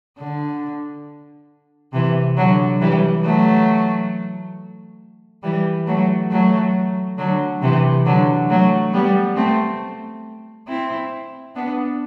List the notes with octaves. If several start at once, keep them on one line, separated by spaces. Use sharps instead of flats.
D3
C3 E3
D3 F#3
E3 G3
F#3 A3
E3 G3
F#3 A3
F#3 A3
D3 F#3
C3 E3
D3 F#3
F#3 A3
G3 B3
A3 C4
C4 E4
B3 D4